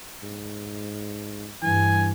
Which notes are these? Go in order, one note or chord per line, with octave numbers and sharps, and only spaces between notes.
G#2
G2 E3 G#5